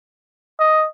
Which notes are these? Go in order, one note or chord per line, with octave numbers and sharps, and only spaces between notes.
D#5